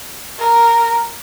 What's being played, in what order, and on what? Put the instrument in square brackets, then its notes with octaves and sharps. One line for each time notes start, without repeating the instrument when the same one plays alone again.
[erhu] A#4